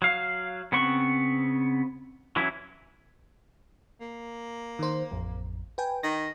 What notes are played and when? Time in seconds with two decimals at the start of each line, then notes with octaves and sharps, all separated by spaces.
0.02 F#3 F5
0.72 C#3 B3 C4 F#5 C#6
2.36 E3 F#3 C#4 E4
4.01 A#3
4.79 D#3 C5
5.11 A1 F2
5.78 B4 G5 G#5
6.03 D#3 A#6